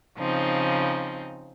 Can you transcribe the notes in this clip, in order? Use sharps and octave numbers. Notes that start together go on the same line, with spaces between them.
C#3 F3 C4 D#4